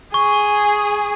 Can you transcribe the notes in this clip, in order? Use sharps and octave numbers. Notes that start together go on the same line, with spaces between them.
G#4 C#6